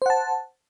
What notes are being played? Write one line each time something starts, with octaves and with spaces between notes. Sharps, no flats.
C5 F#5 A5